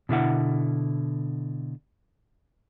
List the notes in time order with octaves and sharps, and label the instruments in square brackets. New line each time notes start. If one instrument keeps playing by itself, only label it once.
[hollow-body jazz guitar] B2 D3 E4 F#5